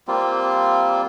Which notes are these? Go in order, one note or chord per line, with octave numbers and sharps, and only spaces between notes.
G3 A#3 C4 F4